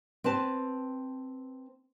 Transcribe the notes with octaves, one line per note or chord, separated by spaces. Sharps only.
C4 B4 A5